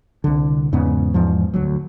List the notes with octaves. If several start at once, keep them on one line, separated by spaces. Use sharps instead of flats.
C2 D3
E2 G#2 C#3 B3
E2 G#2 F3
D2 F#3